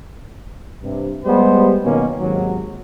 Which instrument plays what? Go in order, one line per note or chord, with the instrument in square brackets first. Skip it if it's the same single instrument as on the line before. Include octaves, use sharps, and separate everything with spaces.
[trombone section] G2 C3
G3 G#3 B3 G4 C5
B2 D#3 F#3 A#3 C#4
G#1 D#2 F#3